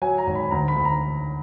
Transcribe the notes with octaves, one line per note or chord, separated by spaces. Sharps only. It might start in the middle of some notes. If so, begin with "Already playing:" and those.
F#3 G#5
A#5
G#1
B5
D2 A#5
B5
D2
A#5